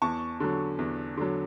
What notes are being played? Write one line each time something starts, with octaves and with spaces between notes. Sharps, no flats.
E2 A5 C#6
D3 F#3
E2
D3 F#3